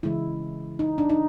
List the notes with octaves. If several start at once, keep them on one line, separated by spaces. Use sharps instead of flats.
C#3 E3 G#3 E4
D#4
D4
D#4